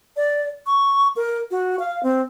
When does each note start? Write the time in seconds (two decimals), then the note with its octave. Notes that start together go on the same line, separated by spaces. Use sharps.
0.16 D5
0.66 C#6
1.16 A#4
1.51 F#4
1.79 F5
2.03 C4